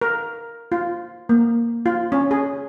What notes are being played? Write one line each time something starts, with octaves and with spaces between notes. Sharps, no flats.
A#4
F4
A#3
F4
C#4
G#4